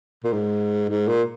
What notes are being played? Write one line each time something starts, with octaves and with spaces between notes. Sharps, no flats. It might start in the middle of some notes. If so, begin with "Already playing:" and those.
A#2
G#2
G#2
A#2